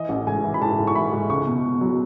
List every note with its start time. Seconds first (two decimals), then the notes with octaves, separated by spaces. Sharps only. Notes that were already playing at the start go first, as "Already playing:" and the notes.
Already playing: E3 D#5
0.09 A1
0.27 G#2 G#5
0.44 E3
0.54 B5
0.61 G#2 A5
0.79 G#2
0.87 C#6
0.95 E3 B5
1.12 G#2
1.29 C#2 C#6
1.47 B2
1.64 B2
1.81 F#3